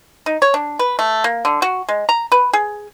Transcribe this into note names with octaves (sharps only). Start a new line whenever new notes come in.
D#4
C#5
D4
B4
A3
A#3
D3
F#4
G#3
A#5
B4
G#4